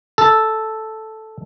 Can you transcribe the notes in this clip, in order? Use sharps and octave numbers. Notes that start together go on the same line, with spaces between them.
A4